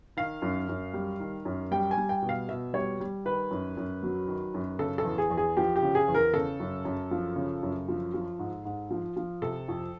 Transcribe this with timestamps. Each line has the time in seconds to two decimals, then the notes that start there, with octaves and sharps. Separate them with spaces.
0.17 D#3 F5
0.42 F#2
0.69 F#2
0.93 G3
1.20 D#3
1.45 F#2
1.71 G3 G5
1.91 G#5
1.97 G3
2.09 G5
2.22 B2
2.29 F5
2.49 B2 E5
2.73 G3 C#5
3.00 G3
3.25 D#3 B4
3.51 F#2
3.77 F#2
4.03 F#3
4.28 D#3
4.54 F#2
4.79 C#3 A4
4.98 A4
5.05 E2
5.18 G#4
5.30 E2
5.37 G#4
5.57 F3 G4
5.76 G4
5.82 C#3
5.95 G#4
6.08 E2
6.14 A#4
6.33 C#3 A4
6.60 F#2
6.85 F#2
7.11 F3
7.36 C#3
7.63 F#2
7.88 F3
8.14 F3
8.39 G#2
8.65 G#2
8.91 F3
9.16 F3
9.42 C3 A4
9.68 F2